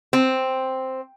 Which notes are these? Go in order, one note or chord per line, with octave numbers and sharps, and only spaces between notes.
C4